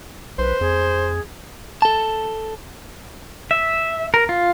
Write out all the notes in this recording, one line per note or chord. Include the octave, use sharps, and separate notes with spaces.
B1 B4 C5
F2 G#4
A4 A5
E5
A#4
F4